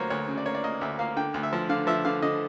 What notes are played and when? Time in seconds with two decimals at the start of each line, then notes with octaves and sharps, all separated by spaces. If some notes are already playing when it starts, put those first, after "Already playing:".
Already playing: D2 F#3 A#3 C5 C#5
0.10 D2 C#5
0.28 C#3
0.38 D5
0.46 A#3 C#5
0.55 D5
0.64 A#3 D#5
0.81 D2 E5
0.99 A#3 F5
1.16 D3 G5
1.34 D2
1.43 E5
1.53 F3
1.69 D3 F5
1.87 F3 E5
2.05 D3 F5
2.22 D3 D#5